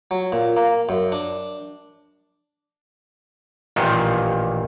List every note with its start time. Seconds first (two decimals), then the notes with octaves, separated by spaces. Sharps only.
0.11 F#3
0.32 A#2
0.56 A#3
0.89 F#2
1.12 D4
3.76 A1 A#2 D#3 F4 G4 F#5